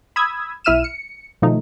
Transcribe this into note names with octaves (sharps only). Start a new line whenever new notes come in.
B5 D#6 E6 G#6
B1 E4 E5 F6 D#7 E7
C#7
B2 D#3 F3 A3 D#4